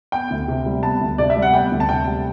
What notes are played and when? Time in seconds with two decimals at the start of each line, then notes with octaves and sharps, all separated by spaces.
0.12 B3 G5
0.30 D2
0.48 C3
0.66 G3
0.83 B3 A5
1.01 D2
1.18 C3 D5
1.30 E5
1.36 G3
1.42 F#5
1.54 B3 G5
1.72 D2
1.80 A5
1.89 C3 G5
2.07 G3